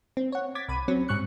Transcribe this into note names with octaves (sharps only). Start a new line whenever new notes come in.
C4
C#5 F#5
D6 G#6 A6 B6
C2 B5 D#7
F#3 C4 C#4
G#2 G3 C#6 F#6 C#7